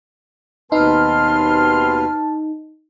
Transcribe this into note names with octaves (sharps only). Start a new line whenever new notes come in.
D#2 B2 C4 D#4 B4 A5 C6 F6